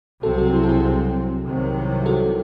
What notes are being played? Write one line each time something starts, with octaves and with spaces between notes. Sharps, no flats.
C2 C3 F#3 C4 F#4 A4
F#4 A4
E4 G#4
A4
E4 G#4
C2 C3 D#3 F#3
F#4 A4